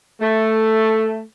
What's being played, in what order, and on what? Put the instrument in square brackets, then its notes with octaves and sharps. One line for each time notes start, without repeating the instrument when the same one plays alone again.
[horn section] A3